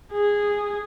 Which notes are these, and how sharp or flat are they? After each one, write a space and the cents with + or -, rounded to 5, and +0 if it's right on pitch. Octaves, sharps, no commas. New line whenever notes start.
G#4 -10